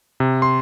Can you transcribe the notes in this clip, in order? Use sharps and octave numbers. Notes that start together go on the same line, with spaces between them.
C3
C6